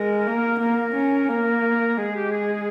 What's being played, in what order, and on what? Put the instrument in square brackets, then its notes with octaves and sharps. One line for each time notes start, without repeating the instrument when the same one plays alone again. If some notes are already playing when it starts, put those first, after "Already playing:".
Already playing: [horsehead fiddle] G#3 [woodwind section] A#4
[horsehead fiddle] A#3
[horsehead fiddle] A#3 [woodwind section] A#4
[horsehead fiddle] C#4
[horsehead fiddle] A#3 [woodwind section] A#4
[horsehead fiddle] G#3 [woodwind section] G#4
[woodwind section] G4
G#4